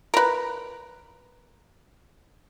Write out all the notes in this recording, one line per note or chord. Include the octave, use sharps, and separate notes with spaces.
A#4 B4